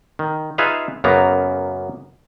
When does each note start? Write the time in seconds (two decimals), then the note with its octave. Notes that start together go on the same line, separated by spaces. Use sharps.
0.19 D#3
0.58 D#4 F4 G#4 B4 E5 F5
1.04 F#2 C#3 A#3 B3 A#5